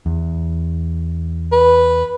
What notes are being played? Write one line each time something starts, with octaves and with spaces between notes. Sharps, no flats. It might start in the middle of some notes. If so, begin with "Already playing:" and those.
E2
B4